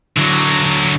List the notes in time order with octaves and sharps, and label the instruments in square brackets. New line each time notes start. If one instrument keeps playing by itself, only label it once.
[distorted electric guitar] D3 F#3